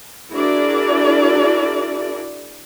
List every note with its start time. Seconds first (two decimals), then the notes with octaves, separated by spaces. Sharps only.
0.32 D4 E4 F#4 G#4 A#4 D5